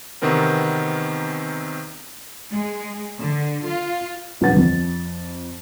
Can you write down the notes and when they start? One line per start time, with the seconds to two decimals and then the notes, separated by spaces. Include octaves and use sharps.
0.22 E2 C3 D#3 B3 C4 A#4
2.51 G#3
3.20 D3
3.66 F4
4.41 D#1 F3 D4 B4 F#5 A6
4.57 F2